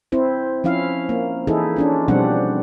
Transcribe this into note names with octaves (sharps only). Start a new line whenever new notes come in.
C4 E4 C5
F3 C#4 E4 F5
A#3
E3 D#4 E4 G#4 A4
C#4 D4 F4
B2 F3 G3 C4 D4 F#5